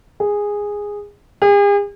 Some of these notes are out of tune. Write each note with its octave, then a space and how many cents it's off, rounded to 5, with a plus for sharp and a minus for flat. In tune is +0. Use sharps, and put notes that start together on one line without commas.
G#4 -10
G#4 -45